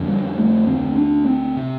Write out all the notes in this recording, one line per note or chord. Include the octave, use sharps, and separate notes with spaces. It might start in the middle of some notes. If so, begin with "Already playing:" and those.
Already playing: F2 D3
G3
A3
D2 D3 C4
D4
C4
C3